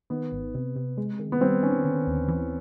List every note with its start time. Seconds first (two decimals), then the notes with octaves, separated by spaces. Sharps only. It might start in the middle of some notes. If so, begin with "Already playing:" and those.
0.10 D#3 B3
0.32 G#1
0.55 C3
0.76 C3
0.97 G#3
1.19 D#3
1.32 B3
1.41 G3 C4
1.63 D#3 C#4
1.84 D3
2.07 D#2
2.28 E3